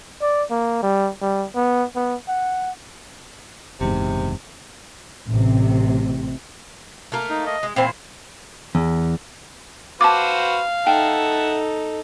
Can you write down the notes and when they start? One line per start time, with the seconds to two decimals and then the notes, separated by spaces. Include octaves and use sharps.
0.21 D5
0.51 A#3
0.83 G3
1.22 G3
1.55 B3
1.96 B3
2.28 F#5
3.81 F#1 E2 G#2 C3
5.28 A1 C3
7.12 A3 A#3 A#4
7.30 D#4
7.46 D#5
7.63 G#3
7.76 A#2 E3 C4 C5
8.75 E2
10.01 F#4 B4 C5 F5 A5 D6
10.87 D#4 A4 E5 F#5 G5 A5